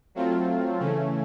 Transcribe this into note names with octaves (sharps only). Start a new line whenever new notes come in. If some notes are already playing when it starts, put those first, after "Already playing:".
F#3 A3 C4 F4
C#3 E3 A3 C#4